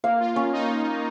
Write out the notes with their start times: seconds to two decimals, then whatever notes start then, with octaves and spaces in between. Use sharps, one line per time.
0.04 A#3 F5
0.20 F4
0.36 C#4
0.52 D#4